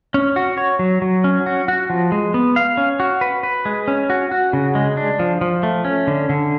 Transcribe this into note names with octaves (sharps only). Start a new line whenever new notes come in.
C#4
F#4
C#5
F#3
F#3
C#4
F#4
F#4
F3
G#3
B3
F5
C#4
F#4
B4
B4
G#3
C#4
F#4
F#4
C#3
G#3
D4
F3
F3
A3
C#4
D3
D3